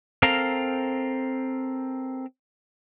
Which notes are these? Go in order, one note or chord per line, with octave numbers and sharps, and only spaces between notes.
C4 A4 A#4 F5 A#5